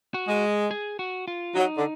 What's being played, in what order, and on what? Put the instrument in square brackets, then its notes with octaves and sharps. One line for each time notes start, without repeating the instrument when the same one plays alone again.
[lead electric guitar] F#4
[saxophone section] G#3
[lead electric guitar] G#4
F#4
F4
[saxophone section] F#3 [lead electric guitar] D#4
[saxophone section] D3